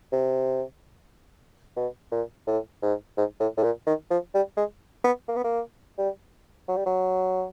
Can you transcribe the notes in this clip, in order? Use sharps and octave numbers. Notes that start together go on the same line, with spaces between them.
C3
B2
A#2
A2
G#2
G#2
A2
A2
A#2
D#3
F3
G3
G#3
B3
A#3
B3
A#3
G3
F#3
G3
F#3